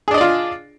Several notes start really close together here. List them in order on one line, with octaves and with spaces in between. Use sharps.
G#4 D4 D#5 D5 F4